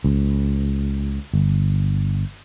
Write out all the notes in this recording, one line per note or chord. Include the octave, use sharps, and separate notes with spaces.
C#2
G1